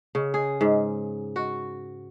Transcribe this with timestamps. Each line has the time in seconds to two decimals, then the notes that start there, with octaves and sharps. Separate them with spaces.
0.15 C#3
0.34 G#4
0.61 G#2
1.36 F#4